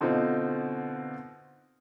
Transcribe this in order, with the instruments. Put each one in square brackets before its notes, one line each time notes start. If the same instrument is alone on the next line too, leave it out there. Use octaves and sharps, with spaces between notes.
[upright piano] B2 D3 C4 D#4 F4